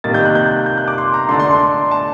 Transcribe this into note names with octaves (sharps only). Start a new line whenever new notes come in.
C3 D#3 G3 A#3 A6
G6
F#6
G6
G6
F#6
D6
C6
A#5
D3 A3 D4 C6
C6
C6
A5